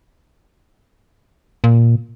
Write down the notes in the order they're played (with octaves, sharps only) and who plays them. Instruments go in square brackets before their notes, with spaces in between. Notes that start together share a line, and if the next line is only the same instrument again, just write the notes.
[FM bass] A#2